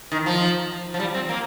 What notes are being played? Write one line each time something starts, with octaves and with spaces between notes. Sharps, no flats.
D#3
F3
F3
G3
C4
A#3